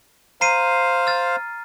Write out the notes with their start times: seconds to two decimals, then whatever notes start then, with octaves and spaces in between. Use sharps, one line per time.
0.41 C5 F5 A#5 C7 D#7
1.07 F6 A6